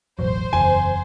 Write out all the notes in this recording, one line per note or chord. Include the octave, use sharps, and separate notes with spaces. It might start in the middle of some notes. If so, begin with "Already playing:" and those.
E1 A1 F#3 C5
F#1 E2 G#5